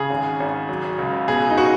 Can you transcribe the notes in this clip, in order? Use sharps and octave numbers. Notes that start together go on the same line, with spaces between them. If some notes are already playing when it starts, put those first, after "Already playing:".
Already playing: C#3 G#4
G#1
G#1
F#3
C#2
B2 G#4
D#4
F#4